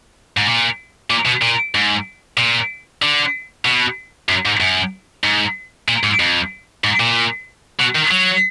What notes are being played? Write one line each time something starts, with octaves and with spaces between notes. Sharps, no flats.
G#2
A#2
A#2
B2
A#2
G#2
A#2
D3
B2
F#2
G#2
F#2
G#2
A#2
G#2
F2
G#2
A#2
B2
D#3
F#3